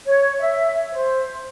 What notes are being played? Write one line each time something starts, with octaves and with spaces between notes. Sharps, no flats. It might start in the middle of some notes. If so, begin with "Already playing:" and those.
C#5
E5
C5